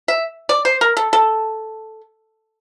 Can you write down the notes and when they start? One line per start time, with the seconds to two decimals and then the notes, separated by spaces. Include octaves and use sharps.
0.08 E5
0.49 D5
0.65 C5
0.81 A#4
0.97 A4
1.13 A4